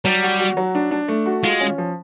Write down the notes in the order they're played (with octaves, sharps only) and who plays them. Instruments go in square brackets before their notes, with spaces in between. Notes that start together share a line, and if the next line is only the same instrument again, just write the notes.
[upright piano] F#3 [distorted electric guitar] G3
[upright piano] F#4
F#4
F#3
D4
D4
A3
F#4
[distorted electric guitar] G#3 [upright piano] F4
[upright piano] C#4
F3